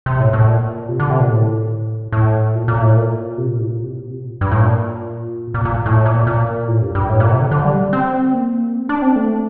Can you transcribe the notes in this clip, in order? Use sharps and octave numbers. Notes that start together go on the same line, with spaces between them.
C3
A2
A2
A#2
C3
D3
C3
A#2
A2
A2
A#2
A#2
A2
A#2
C3
A#2
A2
A#2
C3
A#2
C3
A#2
G2
A2
A#2
A#2
A#2
A2
A#2
A#2
A2
G2
G2
A2
A#2
C3
D3
D3
G3
C4
A#3
C4
D4
C4
A3